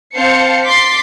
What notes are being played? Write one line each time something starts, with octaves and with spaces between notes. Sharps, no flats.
C4 C5 F5 A5 C7 C#7
C6 D6 A6 B6 C7